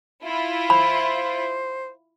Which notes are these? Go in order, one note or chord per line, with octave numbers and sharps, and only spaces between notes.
E4 F4
C5 B5